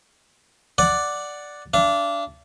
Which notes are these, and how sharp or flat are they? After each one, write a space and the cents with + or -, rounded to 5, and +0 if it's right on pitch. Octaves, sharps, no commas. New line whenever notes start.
D5 +0 F#5 +0
D4 -15 F5 -45